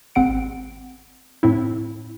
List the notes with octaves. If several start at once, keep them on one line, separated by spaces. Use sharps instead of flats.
G#1 C4 F#5 D7
A2 C4 E4